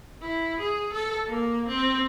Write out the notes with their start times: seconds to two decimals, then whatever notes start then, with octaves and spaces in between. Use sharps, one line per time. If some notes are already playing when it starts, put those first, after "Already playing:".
0.22 E4
0.60 G#4
0.93 A4
1.27 A#3
1.68 C4